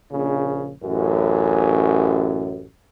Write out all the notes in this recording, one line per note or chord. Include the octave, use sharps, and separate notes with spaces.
A#1 C#3
A1 F#2